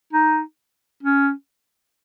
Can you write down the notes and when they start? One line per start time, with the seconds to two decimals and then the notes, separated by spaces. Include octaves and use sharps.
0.13 D#4
1.03 C#4